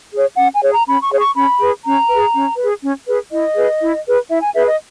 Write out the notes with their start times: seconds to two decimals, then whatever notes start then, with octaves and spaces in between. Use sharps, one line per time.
0.12 G#4 C#5
0.37 C#4 F#5
0.54 G#5
0.62 G#4 C#5
0.70 A#5
0.86 C#4 B5
1.02 C#6
1.11 G#4 C#5
1.19 C#6
1.35 C#4 B5
1.60 G#4 B4
1.84 C#4 A#5
2.09 G#4 B4
2.34 C#4
2.57 G#4 B4
2.82 C#4
3.06 G#4 B4
3.31 E4 D#5
3.56 G#4 B4
3.80 E4
4.06 G#4 B4
4.29 E4 E5
4.42 G#5
4.54 G#4 B4 E5
4.67 D#5